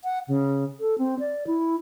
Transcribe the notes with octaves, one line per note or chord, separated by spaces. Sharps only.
F#5
C#3
A4
C4
D5
E4